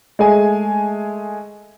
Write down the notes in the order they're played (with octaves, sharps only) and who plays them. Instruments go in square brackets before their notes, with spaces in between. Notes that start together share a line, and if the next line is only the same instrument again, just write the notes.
[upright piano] G#3 A3 G#4 G#5